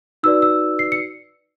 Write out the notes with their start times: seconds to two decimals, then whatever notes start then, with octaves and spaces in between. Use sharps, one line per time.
0.23 D#4 F#4 B4 D5 E6
0.42 E6
0.79 C7
0.92 C#7